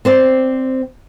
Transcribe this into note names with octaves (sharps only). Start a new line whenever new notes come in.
C4 C5 D5